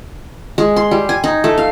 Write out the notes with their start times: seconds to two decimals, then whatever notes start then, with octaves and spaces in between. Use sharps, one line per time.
0.58 G#3
0.76 C6
0.91 G3
1.09 G#5
1.24 D#4
1.44 A3
1.58 F5